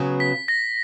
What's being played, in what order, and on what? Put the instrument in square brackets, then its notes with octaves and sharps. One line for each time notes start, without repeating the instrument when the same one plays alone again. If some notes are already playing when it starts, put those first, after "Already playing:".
Already playing: [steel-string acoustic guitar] C#3 F#3 B3
[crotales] B6
A#6